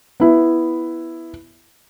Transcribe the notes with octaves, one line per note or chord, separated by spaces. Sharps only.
B3 E4